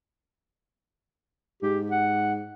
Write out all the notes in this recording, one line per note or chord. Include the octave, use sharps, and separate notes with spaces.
G#2 G4
F#5